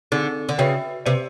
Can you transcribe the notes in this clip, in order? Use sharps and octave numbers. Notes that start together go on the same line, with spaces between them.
D3 C4 D#4 G#4
D3
C#3 F#4 B4 E5 G5
C3 G4 B4 D5